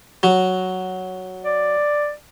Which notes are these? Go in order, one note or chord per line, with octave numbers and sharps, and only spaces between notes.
F#3
D5